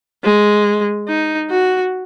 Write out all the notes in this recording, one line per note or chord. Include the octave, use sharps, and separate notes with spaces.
G#3
D#4
F#4